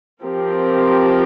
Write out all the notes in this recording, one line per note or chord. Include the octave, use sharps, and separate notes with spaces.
F3 C4 G4 A#4